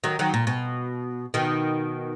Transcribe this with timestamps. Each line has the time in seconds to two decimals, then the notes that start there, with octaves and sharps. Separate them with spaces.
0.04 D#3 F#3
0.19 D#3 F#3
0.34 A#2
0.47 B2
1.34 B2 D#3